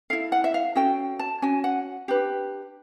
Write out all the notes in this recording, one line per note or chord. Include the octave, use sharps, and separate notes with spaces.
E4 A4 F5
F#5
E5
F5
C#4 F#4 A4 G5
A5
C#4 F#4 G#5
F#5
D4 G4 B4